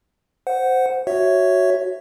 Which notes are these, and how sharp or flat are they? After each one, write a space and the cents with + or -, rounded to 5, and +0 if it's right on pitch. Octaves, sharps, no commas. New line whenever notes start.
C5 -10 F#5 +0
F#4 +0 C#5 +0 E5 +0